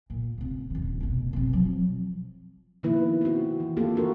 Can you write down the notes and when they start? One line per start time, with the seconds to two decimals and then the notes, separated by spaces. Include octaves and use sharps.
0.10 A#2
0.38 C#3 C4
0.70 D#1 D#3
1.00 F1 B2
1.33 B2 C4
1.53 F3 F#3
2.83 B2 D#3 F3 A#3 E4 B4
3.21 C4 F#4
3.60 E3
3.77 A3 A#3 C4 F4 G4 A4
3.96 D4 F#4 A#4